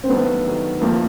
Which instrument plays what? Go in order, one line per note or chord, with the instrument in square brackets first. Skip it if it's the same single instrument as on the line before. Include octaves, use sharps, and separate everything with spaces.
[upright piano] C4
[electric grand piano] G2 D#3 F#3 A3 [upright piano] B3
[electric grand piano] G2 D#3 F#3 A3
[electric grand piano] F2 D3 F3 A3 [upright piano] A#3